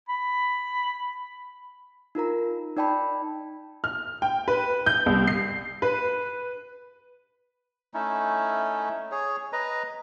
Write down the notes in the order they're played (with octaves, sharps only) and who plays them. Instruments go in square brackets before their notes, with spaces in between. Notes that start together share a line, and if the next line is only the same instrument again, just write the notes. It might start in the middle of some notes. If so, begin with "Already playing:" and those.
[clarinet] B5
[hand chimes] D#4 F4 A#4 A#5
D#4 D5 G5 A5 B5
[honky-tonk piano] F6
G5
B4
G6
C2
C7
B4
[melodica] A3 C#4 D#4 E4
G#4 C#5
B4 D#5 A#5